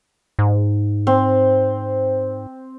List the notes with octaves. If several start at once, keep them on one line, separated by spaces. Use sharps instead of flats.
G#2
C4